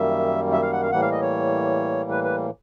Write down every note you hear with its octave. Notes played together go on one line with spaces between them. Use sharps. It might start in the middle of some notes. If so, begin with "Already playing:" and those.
Already playing: F#2 D#3 G3 A#3 E5
E5
F5
F#5
F5
A2 E3 G3 A#3 F#5
F5
D#5
C#5
B4
B4